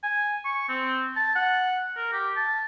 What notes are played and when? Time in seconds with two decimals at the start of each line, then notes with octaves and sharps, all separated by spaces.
0.03 G#5
0.45 C#6
0.69 C4
1.16 A5
1.35 F#5
1.96 A#4
2.12 G4
2.36 A5